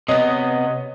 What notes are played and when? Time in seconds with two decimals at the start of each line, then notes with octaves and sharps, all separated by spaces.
0.08 C3 B3 C#5 D#5 D#6